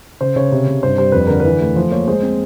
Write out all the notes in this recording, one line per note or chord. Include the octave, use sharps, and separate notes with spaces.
C#3 C5
C#3 C#5
C3
C3
G2 C5
G3 C5
F2 B4
D3 A#4
B4
E3
A3
F3 C5
A#3 C#5
G#3 C5
C4